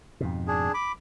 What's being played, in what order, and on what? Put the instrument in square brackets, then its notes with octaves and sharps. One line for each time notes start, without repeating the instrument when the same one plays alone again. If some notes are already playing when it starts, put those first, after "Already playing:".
[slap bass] F2 G#2 B2
[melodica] D4 G#4
B5 D6